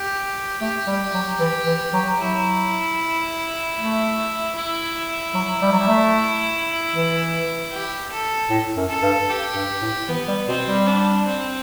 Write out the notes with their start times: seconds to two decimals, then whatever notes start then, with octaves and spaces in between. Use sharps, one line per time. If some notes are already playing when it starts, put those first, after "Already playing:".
Already playing: G4
0.61 A3 G4
0.87 G3
1.14 F#3
1.39 E3
1.66 E3
1.93 F#3
2.19 F#3 E4
3.76 A3
4.56 E4
5.34 F#3
5.62 G3
5.72 F#3
5.79 G3
5.87 A3
6.92 E3
7.71 G4
8.11 A4
8.50 A2
8.77 F#2
8.89 A4
9.02 G2
9.30 G4
9.55 G2
9.81 A2
10.08 E3 B3
10.28 G3
10.48 B2 C4
10.67 G3
10.87 D4
11.27 C4